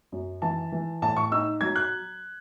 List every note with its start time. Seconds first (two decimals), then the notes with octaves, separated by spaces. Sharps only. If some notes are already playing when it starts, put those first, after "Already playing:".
0.12 F#2
0.42 E3 A5
0.72 E3
1.02 A2 A5
1.17 C#6
1.32 D#4 E6
1.61 F#3 G#6
1.76 F#6